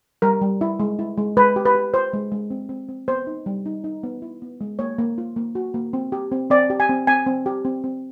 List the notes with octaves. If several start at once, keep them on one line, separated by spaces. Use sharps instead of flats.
G3 A#4
G3
E4
G#3
E4
G#3
G#3 B4
G4
B4
G4
F4 C5
G#3
G#3
C4
C4
C4
B3 C5
D#4
G3
D#4
D#4
B3
E4
B3
G#3
A#3 C#5
A#3
F4
A#3
F#4
A#3
C4
G4
C4
C4 D5
G4
G#5
C4
C4 G#5
C4
G4
C4
C4